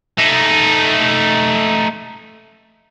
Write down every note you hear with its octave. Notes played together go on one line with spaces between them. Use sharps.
A3 D#4